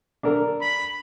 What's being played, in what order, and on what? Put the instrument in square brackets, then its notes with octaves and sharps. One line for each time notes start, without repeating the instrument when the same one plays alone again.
[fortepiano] D4 A4 A#4
[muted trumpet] B5